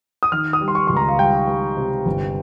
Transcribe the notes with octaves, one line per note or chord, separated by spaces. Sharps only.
D#6
D#3 F6
D#6
G3
C6
C#6
C#2 C6
A#5
F5
G3 G5
G3
C3
G1